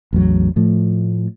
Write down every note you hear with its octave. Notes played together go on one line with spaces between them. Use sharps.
A1 E2 F#3
A2 F3 A3